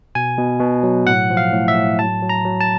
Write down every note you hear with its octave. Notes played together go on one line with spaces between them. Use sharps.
B2 G#5
B2
B2
F#3
A2 F#5
F3
F5
A2
E5
A2
F#3 A5
F#3
A#5
F#3
A5